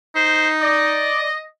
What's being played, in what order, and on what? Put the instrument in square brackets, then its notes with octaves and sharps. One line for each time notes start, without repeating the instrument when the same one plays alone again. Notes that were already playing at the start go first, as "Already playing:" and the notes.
[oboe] D#4 [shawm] C5
[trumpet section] D5 [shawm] D#5